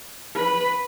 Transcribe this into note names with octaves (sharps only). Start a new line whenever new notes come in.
B4